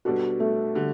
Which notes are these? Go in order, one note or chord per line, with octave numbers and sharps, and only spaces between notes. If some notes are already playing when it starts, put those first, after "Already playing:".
B2 G3 D4 F#4 A4
A3
D3 G3